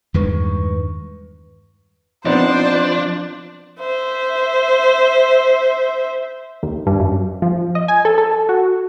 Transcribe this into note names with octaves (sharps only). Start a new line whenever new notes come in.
E2 G2 D#3 G#3 B4 C#6
F3 B3 C4 D4 D#4 C5 D5
C5 E5
D#2
G2
F#2
F3
D#5
G#5
A4
A4
F#4